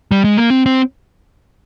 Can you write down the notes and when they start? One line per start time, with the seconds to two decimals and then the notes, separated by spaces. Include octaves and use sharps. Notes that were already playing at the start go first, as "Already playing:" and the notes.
0.11 G3
0.24 G#3
0.37 A#3
0.50 C4
0.66 C4